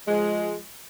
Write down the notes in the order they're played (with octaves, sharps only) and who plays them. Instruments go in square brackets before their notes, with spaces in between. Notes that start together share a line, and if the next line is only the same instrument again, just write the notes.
[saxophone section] F3 G#3